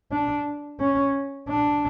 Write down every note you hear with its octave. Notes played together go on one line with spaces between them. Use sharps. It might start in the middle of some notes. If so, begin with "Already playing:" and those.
D4
C#4
D4